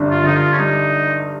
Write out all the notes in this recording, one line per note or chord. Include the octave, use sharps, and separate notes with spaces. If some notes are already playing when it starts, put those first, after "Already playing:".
Already playing: G1 G2
F4
G1 D#4
F4
C#4
G3 D#4